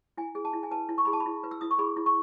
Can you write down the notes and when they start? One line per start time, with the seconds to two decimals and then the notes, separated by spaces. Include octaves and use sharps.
0.17 E4 G#5
0.35 G#4
0.45 A5
0.53 E4
0.63 G#5
0.71 B4 A5
0.89 E4
0.98 C#6
1.05 G#4 B5
1.13 A5
1.20 B5
1.26 E4
1.44 B4
1.51 E6
1.61 E4 D#6
1.71 C#6
1.79 G#4 B5
1.97 E4
2.06 C#6